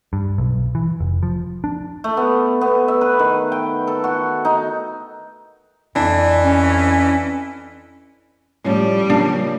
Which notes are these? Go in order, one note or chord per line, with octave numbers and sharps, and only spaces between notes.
G2
B1
E3
F1
F3
D4
A3
B3
B3
E5
B4
D#3
G5
A4
F#4
D#4
F2 E3 D4
C#4
A2 F3 G3 C#4
C#3 F3 A#3 D4